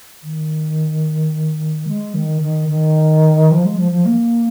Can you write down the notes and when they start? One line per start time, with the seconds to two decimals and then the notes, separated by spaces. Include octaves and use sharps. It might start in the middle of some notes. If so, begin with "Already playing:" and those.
0.23 D#3
1.87 G#3
2.14 D#3
2.41 D#3
2.69 D#3
3.51 F3
3.65 G#3
3.78 F3
3.92 F3
4.05 A#3